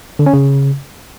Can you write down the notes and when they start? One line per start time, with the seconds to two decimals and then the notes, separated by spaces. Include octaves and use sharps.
0.19 D3
0.26 C#4
0.33 C#3